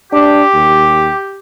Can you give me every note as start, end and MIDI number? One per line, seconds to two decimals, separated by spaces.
0.12 0.43 62
0.12 1.39 67
0.53 1.12 39